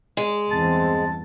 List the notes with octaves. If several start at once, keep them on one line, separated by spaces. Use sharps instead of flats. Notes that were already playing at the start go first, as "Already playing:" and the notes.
G#3
E2 G2 C4 A5